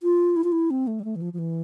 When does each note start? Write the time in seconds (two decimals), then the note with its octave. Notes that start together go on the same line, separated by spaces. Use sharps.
0.03 F4
0.36 E4
0.44 F4
0.52 E4
0.70 C4
0.87 A3
1.00 G3
1.04 A3
1.16 E3
1.22 F3
1.33 F3
1.39 E3